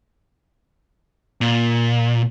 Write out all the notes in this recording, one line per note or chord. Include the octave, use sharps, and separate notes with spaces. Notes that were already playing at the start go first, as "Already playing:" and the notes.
A#2